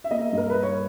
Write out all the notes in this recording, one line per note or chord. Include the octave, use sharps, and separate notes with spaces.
E5
A#3 D#5
G2 A#4
G2 B4
C#5